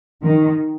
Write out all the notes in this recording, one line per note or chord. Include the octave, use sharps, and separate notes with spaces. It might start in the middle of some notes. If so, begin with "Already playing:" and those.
D#3